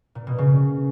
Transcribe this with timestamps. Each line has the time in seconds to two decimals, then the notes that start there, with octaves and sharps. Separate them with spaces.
0.15 A#2
0.27 B2
0.38 C#3